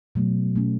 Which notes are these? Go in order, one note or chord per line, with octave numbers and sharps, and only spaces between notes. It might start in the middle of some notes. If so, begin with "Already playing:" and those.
B2 F#3 A3
B2 A3 C#4